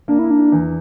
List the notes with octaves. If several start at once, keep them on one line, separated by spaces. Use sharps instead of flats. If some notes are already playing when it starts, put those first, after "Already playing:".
A#3 D4
E4
D4
E2